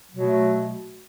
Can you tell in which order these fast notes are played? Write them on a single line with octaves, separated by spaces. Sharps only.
F#3 B2 A3